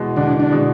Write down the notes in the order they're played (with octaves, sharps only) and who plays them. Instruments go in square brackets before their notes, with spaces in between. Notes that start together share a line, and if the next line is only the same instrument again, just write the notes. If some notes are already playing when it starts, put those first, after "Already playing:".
Already playing: [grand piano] E2 B2 G#3
[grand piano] E2 [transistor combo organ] D3 D4
[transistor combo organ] D3 D4
[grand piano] B2 G#3